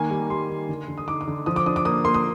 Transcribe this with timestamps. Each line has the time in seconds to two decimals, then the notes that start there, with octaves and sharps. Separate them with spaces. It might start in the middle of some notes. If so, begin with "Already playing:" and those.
Already playing: D#3 A#3 G#5
0.10 G3
0.30 G3 C6
0.50 D#3
0.69 D3
0.88 D3
0.98 D#6
1.08 D#4 D6
1.21 D6
1.27 D3
1.46 F3 D#6
1.56 D6
1.66 D4 D#6
1.76 D6
1.85 A#3 D#6
2.05 A#3 C6
2.14 D#6